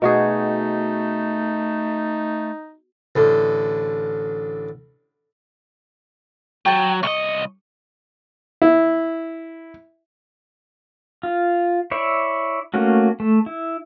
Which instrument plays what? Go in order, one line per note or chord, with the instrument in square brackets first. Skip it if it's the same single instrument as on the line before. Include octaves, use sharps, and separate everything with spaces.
[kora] B2 F#4 G#4 [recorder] A3 [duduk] D#4
[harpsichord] A1 D3
[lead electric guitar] F#3 [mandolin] G5 A5
[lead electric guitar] C2 D#5 [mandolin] C#6
[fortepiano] E4
[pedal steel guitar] F4
E4 C#5 D5 E5
A3 A#3 C#4 F#4
A3
E4